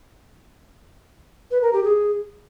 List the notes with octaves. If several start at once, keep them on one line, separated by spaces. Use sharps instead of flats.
B4
A#4
G4
G#4